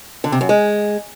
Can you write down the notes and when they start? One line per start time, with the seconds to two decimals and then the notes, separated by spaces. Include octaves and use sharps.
0.24 D3
0.32 C3
0.41 F#2
0.49 G#3